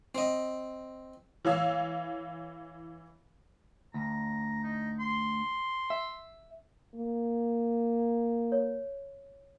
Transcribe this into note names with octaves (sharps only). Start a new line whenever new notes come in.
C4 D#5
E3 C#5 F5 E6
D2 A#5
D#4
C6
E5
A#3
C#5